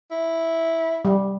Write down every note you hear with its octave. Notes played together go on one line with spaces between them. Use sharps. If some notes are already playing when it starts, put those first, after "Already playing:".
E4
G3